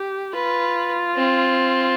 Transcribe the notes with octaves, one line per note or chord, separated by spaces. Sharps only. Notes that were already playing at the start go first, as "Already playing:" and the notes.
Already playing: G4
F4 B4
C4